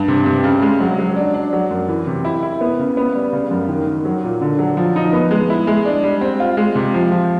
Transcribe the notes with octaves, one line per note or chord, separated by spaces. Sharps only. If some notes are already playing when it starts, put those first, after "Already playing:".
Already playing: G2
C3
C3
C#3
G#3
F#3
F#3
D4
D4
F#3
F#2
E3
C3
E4
E4
B3
C#3
B3
G3
C#3
F#2
D#3
D#3
F#3
A#2
D3
F#3
F3
D#4
B3
G#3
E4
G#3
D4
G3
C4
F4
G#3
C3
F3
F3